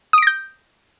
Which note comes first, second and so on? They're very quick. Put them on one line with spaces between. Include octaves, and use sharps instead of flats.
D#6 D7 A#6 G6